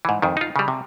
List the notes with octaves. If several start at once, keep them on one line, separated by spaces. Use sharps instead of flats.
G#2 E3
F2 D#3
D#4 F4
C#3 G3
C3